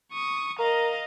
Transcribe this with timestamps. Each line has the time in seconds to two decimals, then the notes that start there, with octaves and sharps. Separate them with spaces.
0.12 C#6 D#6
0.59 A#4 D#5 F5